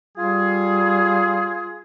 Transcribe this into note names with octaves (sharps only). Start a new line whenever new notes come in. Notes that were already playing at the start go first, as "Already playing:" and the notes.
G3 F4 G#4